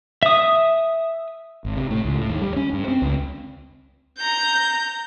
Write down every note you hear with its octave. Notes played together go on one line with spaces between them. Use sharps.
E5 D#6
G#1
C3
A2
C#2
A2
D#2
G3
C#4
G2
C4
C#2
A#5 G6